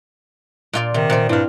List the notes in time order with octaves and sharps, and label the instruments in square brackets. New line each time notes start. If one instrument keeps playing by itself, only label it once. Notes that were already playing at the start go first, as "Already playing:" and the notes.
[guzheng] A#2 F4 D5
[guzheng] C3 [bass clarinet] D#3
[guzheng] A#2 D5 [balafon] C5 E5
[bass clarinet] G2 [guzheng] C4 F5 [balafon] E4